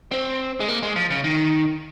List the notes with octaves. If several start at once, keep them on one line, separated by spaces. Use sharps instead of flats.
C4
G#3
A#3
G#3
F3
C#3
D#3